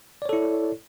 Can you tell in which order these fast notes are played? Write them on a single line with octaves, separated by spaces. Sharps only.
D5 C#5 A4 E4